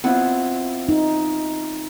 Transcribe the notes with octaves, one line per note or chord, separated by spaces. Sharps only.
B3 C4 E4 F4
D#4